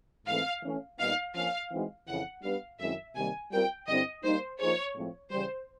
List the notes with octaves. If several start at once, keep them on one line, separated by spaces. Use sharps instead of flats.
G#2 E3 A3 C4 F5
E3 A3 C#4
A#2 G3 B3 D#4 F5
F3 A#3 C#4 F5
E3 G#3 C4 D#4 F#4
F2 C#3 E3 F#5
G3 B3 D4 G4 B4 F5
F#2 D#3 G#3 C4 E4 E5
C3 D#3 G3 A#3 G#5
G3 C4 F4 A#4 G5
G2 D3 G3 C4 E4 D#5
G3 A#3 D#4 C5
F3 A#3 D#4 G#4 C5 C#5
A2 F3 G#3 C4
C#3 E3 G3 C5